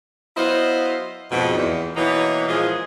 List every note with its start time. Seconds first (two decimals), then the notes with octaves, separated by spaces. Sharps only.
0.37 F#3 B3 E4 C5 D#5 F5
1.31 F2 G#2 B2
1.58 E2
1.96 B2 E3 F#3 A#3 B3 D#4
2.49 A#2 E3 F3 G#3 F4 G#4